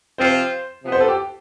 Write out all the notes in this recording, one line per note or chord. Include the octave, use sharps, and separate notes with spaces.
C3 F3 C4 F4 C5
C3 F3 B3
C5
A4
G4